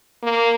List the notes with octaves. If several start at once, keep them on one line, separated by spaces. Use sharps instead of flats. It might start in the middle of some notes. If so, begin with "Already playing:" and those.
A#3